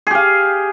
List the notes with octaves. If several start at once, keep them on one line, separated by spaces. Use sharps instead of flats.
G4 G#4 F5